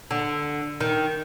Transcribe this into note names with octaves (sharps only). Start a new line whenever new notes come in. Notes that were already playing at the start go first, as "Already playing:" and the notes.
D3
D#3